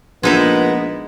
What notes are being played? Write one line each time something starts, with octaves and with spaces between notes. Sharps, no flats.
A#1 G#3 B3 D#4 E4